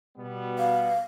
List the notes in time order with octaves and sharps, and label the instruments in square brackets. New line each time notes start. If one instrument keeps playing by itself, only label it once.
[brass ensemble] B2 G3 B3
[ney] F5